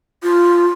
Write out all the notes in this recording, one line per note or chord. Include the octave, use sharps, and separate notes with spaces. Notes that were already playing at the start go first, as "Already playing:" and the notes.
F4